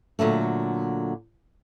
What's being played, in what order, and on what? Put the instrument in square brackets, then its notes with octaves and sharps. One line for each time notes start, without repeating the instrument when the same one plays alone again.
[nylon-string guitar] A#2 D3 F#3 A3